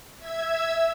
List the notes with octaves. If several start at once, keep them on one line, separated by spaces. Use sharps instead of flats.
E5 E6 G#6